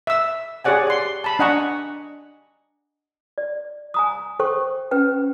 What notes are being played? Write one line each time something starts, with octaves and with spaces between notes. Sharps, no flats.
E5 E6
G4 G#4 C#5 D5 F#5 G#5
D5 C6
A5 B5
D4 D#5 F#5 G#5 A#5 C#6
D5
G#5 A#5 D#6
A4 C5 G5 C#6
C#4 B4 G5